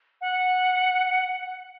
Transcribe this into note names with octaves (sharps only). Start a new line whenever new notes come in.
F#5